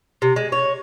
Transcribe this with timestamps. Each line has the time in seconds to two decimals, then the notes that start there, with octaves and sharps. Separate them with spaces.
0.22 C3
0.36 G#3
0.52 C#5